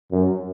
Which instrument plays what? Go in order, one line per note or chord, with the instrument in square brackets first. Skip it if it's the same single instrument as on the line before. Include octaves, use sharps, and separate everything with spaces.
[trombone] F#2